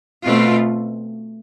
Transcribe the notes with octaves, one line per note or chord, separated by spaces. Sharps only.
B2 A3 C4 F4